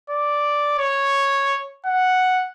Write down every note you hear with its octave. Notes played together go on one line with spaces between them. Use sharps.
D5
C#5
F#5